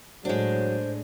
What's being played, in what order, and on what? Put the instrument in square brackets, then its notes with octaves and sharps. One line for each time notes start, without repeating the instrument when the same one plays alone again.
[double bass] A2 [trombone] F#3 [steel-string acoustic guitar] G#3 D4 [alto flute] C5